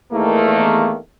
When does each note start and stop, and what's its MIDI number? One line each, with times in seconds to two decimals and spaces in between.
0.12 0.94 40
0.12 0.94 51
0.12 0.94 57
0.12 0.94 58